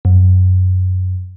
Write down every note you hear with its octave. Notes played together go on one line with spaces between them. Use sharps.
F#2